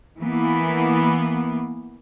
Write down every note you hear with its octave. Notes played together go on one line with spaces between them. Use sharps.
E3 A#3 B3